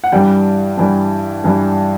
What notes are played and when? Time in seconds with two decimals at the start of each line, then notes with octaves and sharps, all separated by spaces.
0.04 F#5
0.12 G2 E3 G3 G5
0.77 G2 E3 G3
1.44 G2 E3 G3